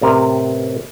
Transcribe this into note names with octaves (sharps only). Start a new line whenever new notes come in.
A1 C3 A#4